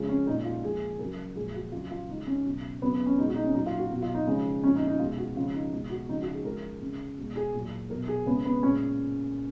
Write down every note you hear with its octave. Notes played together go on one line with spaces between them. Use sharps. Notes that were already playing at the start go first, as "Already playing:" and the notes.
Already playing: C#3 F3 G#3
C#4
A#2 G#3 D#4
F4
A#2 F3 G#3 G#4
C#3 F#3 A#4
A#2 F3 G#3 G#4
F#4
C#3 F#3 F4
F4
C#3 G#3 D#4
C#4
B2 F#3
C#3 F#3 B3
B3
C#4
B2 G#3 D#4
F#4
D#4
C#4
A#2 F#3 D#4
F4
F#4
B2 F#3
F4
D#4
C#3 F3 G#3
A#2 F3 G#3 C#4
D#4
D#4
B2 G#3 F4
F#4
C#3 F3 G#3 F4
D#4
B2 G#3 F4
F#4
C#3 F3 G#3 D#4
F#4
G#4
C#3 F3 G#3 A#4
C#3 G#3
B2 G#3
G#4
A#2 F#3
B2 F#3 A#4
G#4
C#3 G#3 B3
B3
A#2 G#3 C#4